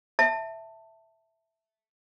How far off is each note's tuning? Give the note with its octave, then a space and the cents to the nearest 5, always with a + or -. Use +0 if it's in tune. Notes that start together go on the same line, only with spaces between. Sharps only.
E5 +0 A5 +15